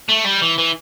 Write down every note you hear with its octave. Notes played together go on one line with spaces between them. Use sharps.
A3
G3
E3
E3